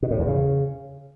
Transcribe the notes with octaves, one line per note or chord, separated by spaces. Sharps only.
B2
A2
E2
C#3